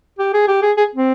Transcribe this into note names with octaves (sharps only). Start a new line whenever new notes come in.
G4
G#4
G4
G#4
G#4
C4